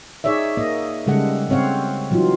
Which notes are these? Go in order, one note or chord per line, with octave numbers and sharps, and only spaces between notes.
D#4 G#4 C#5 D5 E5
A#3 D#5
C#3 G3 G#3 A4 F#5
C#3 C4 C#5 F5 F#5
E3 F#3 D#4 F4